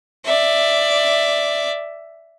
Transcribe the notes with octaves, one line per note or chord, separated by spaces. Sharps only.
D5 E5